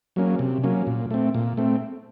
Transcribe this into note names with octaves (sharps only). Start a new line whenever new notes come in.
F#3 A#3 C#4
C3
F#3 A#3 C#4
A#2
A3 C4
A#2
A3 C4